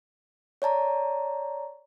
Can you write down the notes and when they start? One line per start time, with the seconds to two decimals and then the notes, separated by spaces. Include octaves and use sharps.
0.62 C#5 D5 A5 A#5